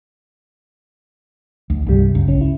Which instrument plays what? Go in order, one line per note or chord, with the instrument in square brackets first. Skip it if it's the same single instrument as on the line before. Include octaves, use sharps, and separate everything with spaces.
[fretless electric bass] D2
[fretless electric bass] C2 [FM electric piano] G2 G3
[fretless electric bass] C#2 [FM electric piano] F#2
[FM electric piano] A#1 C#4
E4